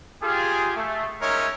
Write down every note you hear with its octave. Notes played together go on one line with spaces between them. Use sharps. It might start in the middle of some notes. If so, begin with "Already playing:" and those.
F4 G4 G#4
A3
G#3 C#4 D#4 A#4 C#5 E5